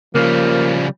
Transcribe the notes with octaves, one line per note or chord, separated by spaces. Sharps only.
C#3 F3 G3 A#3